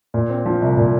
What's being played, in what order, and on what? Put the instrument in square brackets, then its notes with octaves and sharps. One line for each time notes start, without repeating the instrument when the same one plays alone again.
[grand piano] A#2
C4
F3
C2
A#2